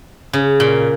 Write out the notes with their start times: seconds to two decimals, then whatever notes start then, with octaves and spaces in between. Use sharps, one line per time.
0.33 C#3
0.60 A#2